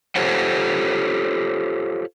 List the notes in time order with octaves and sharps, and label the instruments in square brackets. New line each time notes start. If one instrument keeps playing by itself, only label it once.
[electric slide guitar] F4 G4 A4 C5 C#5 F#5